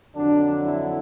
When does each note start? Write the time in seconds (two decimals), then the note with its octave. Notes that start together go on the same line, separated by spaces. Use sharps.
0.15 F2 D3 F#3 D4
0.63 E4